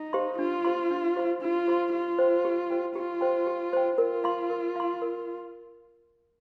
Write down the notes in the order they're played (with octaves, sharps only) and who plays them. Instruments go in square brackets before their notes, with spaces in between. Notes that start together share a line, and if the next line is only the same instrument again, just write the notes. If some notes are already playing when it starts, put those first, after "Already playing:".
Already playing: [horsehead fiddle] D#4
[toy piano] G4 C5 F5 C6
[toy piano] D4 [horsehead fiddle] F4
[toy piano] G4 C5 F5 C6
D4
G4 C5 F5 C6
[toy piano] D4 [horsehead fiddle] F4
[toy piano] G4 C5 F5 C6
[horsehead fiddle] F4 [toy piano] G4
[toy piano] C5 G5
G4
C5 G5
[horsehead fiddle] F4 [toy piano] G4
[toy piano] C5 G5
G4
C5 G5
[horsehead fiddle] F4 [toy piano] A#4
[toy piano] F5 C6
A#4
F5 C6
A#4